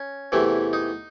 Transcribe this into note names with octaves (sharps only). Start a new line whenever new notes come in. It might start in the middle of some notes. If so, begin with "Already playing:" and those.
Already playing: C#4
E2 C3 E3 A3
D#4